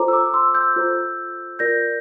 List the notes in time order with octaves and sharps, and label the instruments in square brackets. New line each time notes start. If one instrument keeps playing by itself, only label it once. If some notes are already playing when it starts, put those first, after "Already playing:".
Already playing: [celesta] F4 A4 C5 A#5 D6
E6
A#5 D6
C6 E6
E6 G6
F4 A4 C5
F4 A#4 D5 G6 A#6